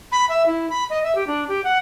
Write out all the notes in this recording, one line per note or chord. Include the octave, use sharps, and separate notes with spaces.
B5
E5
E4
B5
D#5
E5
G4
D4
G4
F#5